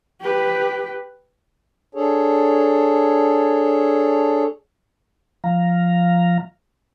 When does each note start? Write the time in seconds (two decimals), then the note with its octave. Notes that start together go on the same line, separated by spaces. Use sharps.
0.21 G4 B4
1.95 D4 G#4 A4 C#5
5.44 F3 F5 A#5